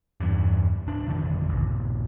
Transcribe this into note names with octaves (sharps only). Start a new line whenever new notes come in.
E2 G2
D1 D4
F2 B2 D3 D#3
A#1 D#2